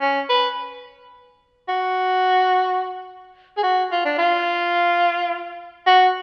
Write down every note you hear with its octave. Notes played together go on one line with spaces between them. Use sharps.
C#4
B4
F#4
G#4
F#4
F4
D4
F4
F#4